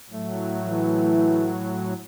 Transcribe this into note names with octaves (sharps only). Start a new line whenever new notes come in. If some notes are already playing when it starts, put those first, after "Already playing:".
A2 F#3 A3
E3